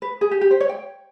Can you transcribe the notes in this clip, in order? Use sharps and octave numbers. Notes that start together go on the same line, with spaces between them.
B4
G#4
G4
G4
C5
C#5
G5